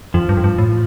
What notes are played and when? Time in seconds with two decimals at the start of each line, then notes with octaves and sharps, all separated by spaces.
0.14 F2 F3
0.29 G2
0.37 F2
0.44 G2
0.58 A2